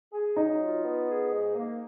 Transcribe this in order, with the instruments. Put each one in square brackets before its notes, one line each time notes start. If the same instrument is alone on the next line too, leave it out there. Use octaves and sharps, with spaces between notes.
[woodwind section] G#4
[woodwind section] F#3 [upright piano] D#4
[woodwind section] F4
B3
G#4
G#2
A#3